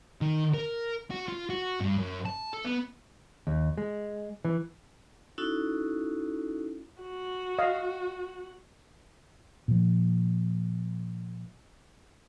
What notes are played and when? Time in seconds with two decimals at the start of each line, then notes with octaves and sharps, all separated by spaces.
0.22 D#3
0.54 A#4
1.11 F#4
1.28 F4
1.50 F#4
1.81 G2
1.98 F#2
2.26 A5
2.53 A4
2.65 B3
3.47 D#2
3.78 G#3
4.45 E3
5.38 C#4 D#4 E4 F#4 A4
7.01 F#4
7.59 D#5 F5
9.68 A#2 F3